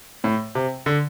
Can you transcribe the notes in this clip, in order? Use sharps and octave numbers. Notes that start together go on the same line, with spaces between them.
A2
C3
D3